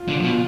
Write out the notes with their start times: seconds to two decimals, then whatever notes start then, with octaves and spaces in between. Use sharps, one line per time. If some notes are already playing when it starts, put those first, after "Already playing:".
Already playing: F4
0.08 D3
0.23 B2